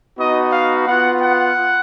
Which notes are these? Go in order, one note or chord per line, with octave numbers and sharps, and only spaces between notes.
B3 D#4 F#4 D#5
F5
B3 F4 F#5
F#5